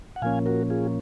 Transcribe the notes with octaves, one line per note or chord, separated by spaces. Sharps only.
F#5
A#2 F3 A#3 C#4 F5 G#5
F#4 A#4
F4 G#4